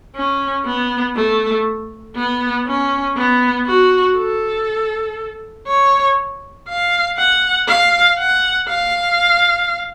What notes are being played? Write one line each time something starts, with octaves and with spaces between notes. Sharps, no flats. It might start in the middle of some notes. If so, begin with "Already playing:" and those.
C#4
B3
A3
B3
C#4
B3
F#4
A4
C#5
F5
F#5
F5
F#5
F5